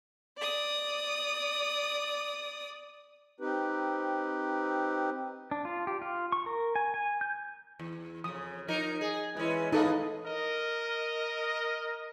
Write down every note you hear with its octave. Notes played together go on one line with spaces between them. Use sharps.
D5 D#6
C4 D#4 G4 B4
D4
F4
G4
F4
C#6
A#4
G#5
G#5
G6
E2
F2 C#3 D#6
F3 D#4 A#4
G#4
E3 G#3 C#4 B4
G#3 B3 D#4 A4 D#5 F5
A#4 D#5